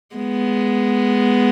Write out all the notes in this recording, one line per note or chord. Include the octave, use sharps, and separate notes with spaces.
G#3 B3